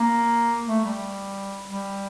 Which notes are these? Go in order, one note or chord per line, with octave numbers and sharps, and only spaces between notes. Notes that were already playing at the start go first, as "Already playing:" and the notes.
Already playing: A#3
A3
G3
G3